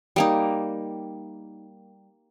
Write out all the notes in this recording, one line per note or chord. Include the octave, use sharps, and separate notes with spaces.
G3 A#3 D#4